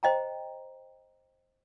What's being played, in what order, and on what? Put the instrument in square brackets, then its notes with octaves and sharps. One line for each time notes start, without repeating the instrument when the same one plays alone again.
[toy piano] C5 D#5 G5 A#5